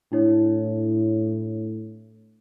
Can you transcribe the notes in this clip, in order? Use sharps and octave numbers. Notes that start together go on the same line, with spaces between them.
A2 D4 E4 C#5